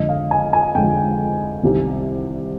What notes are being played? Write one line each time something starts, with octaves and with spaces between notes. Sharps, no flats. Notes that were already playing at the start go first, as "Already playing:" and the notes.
Already playing: F2 D3 G#3 D#5
F5
G#5
G#5
F2 D3 G#3 G5
C2 C3 D#3 G3